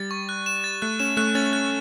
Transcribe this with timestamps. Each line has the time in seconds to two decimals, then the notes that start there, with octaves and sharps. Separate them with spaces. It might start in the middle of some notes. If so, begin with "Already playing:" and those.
Already playing: G3 A6
0.11 C#6
0.29 F#6
0.46 E7
0.64 A6
0.82 A3 F#6
0.99 C#4 E7
1.17 A3 F#6
1.35 C#4 A6
1.53 F#6